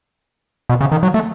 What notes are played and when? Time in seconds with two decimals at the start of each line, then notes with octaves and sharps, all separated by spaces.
0.69 B2
0.81 C#3
0.92 D#3
1.03 F#3
1.14 A3